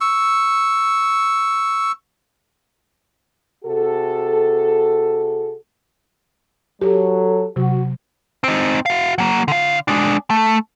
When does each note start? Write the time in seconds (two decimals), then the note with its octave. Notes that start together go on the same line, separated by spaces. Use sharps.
0.01 C#6 E6
3.64 C3 F#4 G#4 A4
6.81 F#3 G4 A4
7.56 C3 F#3 F#4
8.44 C4 D#4
8.86 F#4 F5
9.18 F#3 A#3
9.48 D3 F5
9.88 G#3 D4
10.30 A3